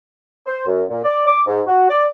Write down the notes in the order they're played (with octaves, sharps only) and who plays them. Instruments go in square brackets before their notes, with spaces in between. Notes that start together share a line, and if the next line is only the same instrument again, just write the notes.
[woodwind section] C5
F#2
A#2
D5
D6
G#2
F#4
D5